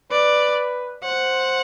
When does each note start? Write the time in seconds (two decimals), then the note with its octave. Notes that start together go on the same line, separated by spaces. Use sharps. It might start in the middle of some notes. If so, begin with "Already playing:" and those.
0.11 B4 D5
1.03 C5 F#5